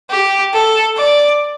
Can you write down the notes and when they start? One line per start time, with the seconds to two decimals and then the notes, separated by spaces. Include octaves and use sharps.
0.10 G4
0.53 A4
0.97 D5